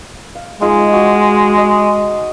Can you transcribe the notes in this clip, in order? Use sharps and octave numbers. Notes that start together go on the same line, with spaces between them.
F5
G#3 D#4 F4 G#4
F#4
D#5